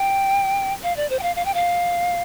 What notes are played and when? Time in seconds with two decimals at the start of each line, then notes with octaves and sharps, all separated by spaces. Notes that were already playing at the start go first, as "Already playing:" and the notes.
Already playing: G5
0.83 F5
0.97 D5
1.10 C5
1.19 G5
1.23 F5
1.36 F5
1.45 G5
1.54 F5